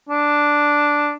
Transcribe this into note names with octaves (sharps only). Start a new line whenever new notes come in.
D4